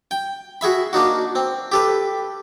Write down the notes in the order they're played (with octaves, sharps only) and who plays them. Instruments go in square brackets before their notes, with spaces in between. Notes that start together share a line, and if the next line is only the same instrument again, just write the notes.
[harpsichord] G5
F#4 G#4 E5 B5
A#3 D4 D#4 F#4
C4
G4 A4 B4